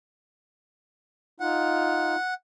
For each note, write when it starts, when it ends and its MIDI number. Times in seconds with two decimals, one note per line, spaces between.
1.40 2.16 63
1.40 2.16 65
1.40 2.34 78